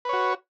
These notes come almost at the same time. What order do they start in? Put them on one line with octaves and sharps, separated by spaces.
B4 C#5 F#4